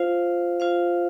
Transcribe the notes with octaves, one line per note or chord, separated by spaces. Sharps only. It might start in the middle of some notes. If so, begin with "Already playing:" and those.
Already playing: F4 C5 F5
F4 C5 F5